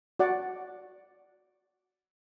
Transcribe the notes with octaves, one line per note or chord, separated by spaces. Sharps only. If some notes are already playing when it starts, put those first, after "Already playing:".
F#4 D5 F#5